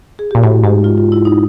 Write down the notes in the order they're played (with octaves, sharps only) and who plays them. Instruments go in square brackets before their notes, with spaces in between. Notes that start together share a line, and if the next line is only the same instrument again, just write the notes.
[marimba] G#4
[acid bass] A#2 [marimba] G4
[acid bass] A2 [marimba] F#4
[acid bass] G#2 [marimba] G4
[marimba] F4
F4
E4
D#4